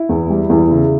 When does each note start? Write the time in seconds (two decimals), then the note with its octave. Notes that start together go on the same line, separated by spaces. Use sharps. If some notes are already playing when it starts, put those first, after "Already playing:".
Already playing: E4
0.09 E2
0.30 G3
0.50 E2
0.71 C#3